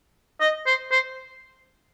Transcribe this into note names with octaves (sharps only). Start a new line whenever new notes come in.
D#5
C5
C5